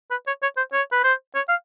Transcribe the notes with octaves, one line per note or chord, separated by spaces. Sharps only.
B4
C#5
C#5
C5
C#5
B4
C5
C#5
F5